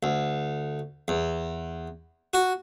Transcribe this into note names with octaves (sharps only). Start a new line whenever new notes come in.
D2
E2
F#4